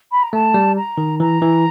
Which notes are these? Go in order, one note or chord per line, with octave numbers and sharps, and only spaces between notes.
B5
A#5
A3 A5
G3
A#5
D#3
E3 A#5
E3